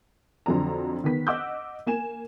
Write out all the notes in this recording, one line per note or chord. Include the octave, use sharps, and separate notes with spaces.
F2 D3 F#3 D5 A#5
D#3 B3 B6
D#5 F#5 D6 E6 F#6 G6
A#3 G#5 E7